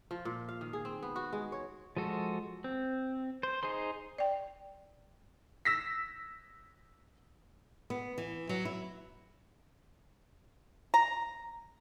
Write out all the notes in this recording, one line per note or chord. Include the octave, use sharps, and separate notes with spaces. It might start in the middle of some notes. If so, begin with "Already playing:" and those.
F3
A#2
F5
D#3
G#4
C4
B3
F#4
G#3
C#5
F3 G#3 F#4 A4
C4
C5
D#4 G#4 C5 C6
D5 G5
E6 A#6 B6
B3
E3
F#3
E4
A#5